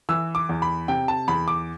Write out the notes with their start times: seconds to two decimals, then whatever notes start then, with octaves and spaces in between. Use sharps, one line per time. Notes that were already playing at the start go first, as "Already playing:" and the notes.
0.09 E3 E6
0.35 D6
0.49 E2
0.62 B5
0.88 C3 G5
1.08 A5
1.28 E2 B5
1.48 D6